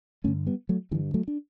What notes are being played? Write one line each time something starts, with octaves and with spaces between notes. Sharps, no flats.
G2 D3 A3 C#4
G3 B3
F#3 A3
G2 D3 E3 G3
F#3 A3
D4